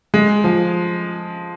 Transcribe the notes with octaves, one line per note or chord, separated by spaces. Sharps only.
G#3
F3